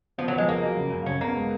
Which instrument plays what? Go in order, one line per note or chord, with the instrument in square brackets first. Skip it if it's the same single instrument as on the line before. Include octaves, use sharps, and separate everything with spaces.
[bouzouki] F3 [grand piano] B3
[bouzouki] F#3
[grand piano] F3 [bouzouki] G#3
[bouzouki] A#3 [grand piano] G#4
[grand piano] F#3
C#3
F#2
[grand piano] C#3 [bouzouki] C#4
[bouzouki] A#3 [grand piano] B3
[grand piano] G#3